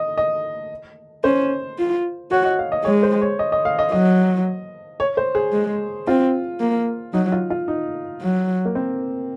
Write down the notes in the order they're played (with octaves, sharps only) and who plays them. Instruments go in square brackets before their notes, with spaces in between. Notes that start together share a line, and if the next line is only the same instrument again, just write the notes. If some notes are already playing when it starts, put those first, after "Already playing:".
Already playing: [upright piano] D#5
D#5
[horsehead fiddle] C#4 [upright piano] C5
[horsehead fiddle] F4
[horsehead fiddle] F#4 [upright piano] C#5
[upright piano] D#5
F5
D#5
[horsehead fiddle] G#3 [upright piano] C#5
[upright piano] C5
C#5
D#5
D#5
F5
D#5
[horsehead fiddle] F#3 [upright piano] D#5
[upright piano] C#5
C5
G#4
[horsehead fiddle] G#3
[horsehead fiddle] C4 [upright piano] F4
[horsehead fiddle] A#3
[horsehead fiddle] F#3 [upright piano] D#4
[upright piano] F4
F4
D#4
[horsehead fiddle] F#3
[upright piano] A#3
C4